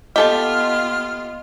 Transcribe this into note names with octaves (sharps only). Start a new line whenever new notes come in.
B3 F4 G4 A4 D#5 A5 F6